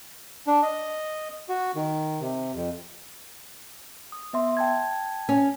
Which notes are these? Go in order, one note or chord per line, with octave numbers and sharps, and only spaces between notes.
D4
D#5
F#4
D#3
C3
F2
D#6
B3 E5 C6
G5 A5 G#6
C#4